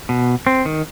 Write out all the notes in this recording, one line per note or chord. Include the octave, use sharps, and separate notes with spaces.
B2
C4
D#3